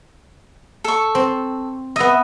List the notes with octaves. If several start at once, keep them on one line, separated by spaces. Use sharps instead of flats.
A4 C#6
C4
B3 D#5 E5